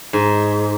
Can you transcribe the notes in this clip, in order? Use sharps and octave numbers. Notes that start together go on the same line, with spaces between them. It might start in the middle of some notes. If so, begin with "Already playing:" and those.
G#2